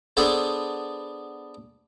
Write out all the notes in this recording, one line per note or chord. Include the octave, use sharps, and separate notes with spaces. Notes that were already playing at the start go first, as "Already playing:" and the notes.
B3 D4 G#4 A4 C5